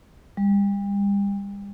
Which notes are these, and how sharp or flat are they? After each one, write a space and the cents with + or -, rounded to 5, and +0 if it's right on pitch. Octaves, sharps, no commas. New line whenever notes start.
G3 +35